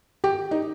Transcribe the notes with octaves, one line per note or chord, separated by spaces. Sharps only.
G4
D#4